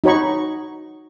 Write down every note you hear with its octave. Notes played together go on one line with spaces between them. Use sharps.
D#4 F#4 C#5 B5 C#6